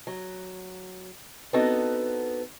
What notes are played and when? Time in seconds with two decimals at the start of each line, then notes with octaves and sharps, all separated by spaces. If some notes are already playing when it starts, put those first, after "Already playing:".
0.07 F#3
1.53 B3 C4 D4 D#4 F#4 A4